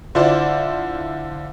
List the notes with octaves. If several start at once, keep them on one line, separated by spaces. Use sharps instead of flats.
D3 E4 F4 C5 D5